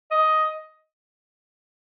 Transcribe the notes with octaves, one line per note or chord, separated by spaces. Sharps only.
D#5